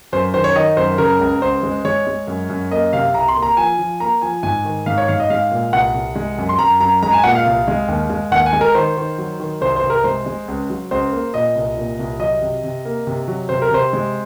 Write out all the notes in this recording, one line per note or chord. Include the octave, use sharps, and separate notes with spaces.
F#2 C5
D#3 C5
C#5
D#3 D#5
F#2 C5
C#3 A#4
C#2
C#2 C5
G#3
G#3 C#5
G#3
F#2
F#2
A#3 D#5
C3 F5
C2 A#5
C6
A#3
A#5
F3 G#5
F3
A#3 A#5
F3 G#5
G#2 G#5
D#3
G#2 F5
C#5
G#2 F5
D#5
G#3 F5
A#2
C2 F#5
C2
G#3
F#2
C6
F#2 A#5
F#2 A#5
G#3 A#5
G#5
A#2 F#5
F5
C2
G#3
D#2
G#3
D#2 F#5
G#5
G#3
A#4
D#3 C5
D#3
F#3
D#3
C2 C5
C5
C2
A#4
G#3 C5
G#3
C#2
F#3
C#2 C5
A#3
A#2 D#5
C2
A#2
C2
F#3 D#5
C3
C3
A#3
C3
F#3
C3 C5
A#4
C3 C5
G#3